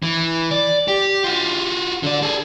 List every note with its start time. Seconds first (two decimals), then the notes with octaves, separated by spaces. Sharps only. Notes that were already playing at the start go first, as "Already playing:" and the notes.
0.03 E3
0.51 D5
0.88 G4
1.24 F4 F#4
2.03 D3 D5
2.22 G#4 A4